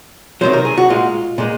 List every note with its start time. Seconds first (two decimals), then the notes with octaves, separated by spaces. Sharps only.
0.41 C3 D#3 F#3 C5
0.53 A#4
0.65 G#4
0.77 F#4
0.89 A#2 G#3 F4
1.38 A#2 G#3